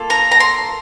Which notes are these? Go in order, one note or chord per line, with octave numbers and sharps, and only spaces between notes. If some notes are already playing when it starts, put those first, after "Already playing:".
Already playing: A#3 F4 A4
A#5
A#5
C6